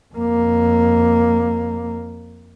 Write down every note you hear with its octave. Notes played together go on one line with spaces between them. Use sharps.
F2 A#3